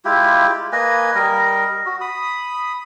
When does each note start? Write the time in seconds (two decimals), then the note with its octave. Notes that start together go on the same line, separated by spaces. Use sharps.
0.05 G#3 E4 F4 G4
0.72 A#3 B4 D#5 G#5
1.15 G3 A#4 D#5
1.86 F#4
2.01 B5 D#6